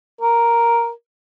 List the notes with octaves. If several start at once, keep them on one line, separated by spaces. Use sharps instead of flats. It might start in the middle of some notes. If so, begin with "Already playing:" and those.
A#4